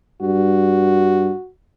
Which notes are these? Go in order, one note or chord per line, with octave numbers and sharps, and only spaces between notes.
G2 F#4